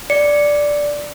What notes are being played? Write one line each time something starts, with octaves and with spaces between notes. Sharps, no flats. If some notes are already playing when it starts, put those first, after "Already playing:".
D5 C#7